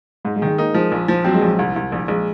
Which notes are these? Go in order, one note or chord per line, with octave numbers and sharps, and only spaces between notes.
G#2 G#3
G#3
D#3
G#3
A#3 D#4
F3 G#3
A#1
F3
F#3 C4
G#3
A#1 F#3
C2
C2
A#1
A#1 G#3